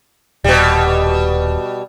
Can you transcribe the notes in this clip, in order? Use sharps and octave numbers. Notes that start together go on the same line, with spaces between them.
D#1 B2 G3